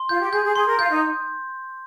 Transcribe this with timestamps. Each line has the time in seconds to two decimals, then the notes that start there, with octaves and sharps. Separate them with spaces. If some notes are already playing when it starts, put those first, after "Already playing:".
Already playing: C6
0.09 F4 G6
0.21 G4
0.33 G#4 G6
0.44 G#4
0.55 G#4 C6
0.68 A#4
0.79 F4 G6
0.91 D#4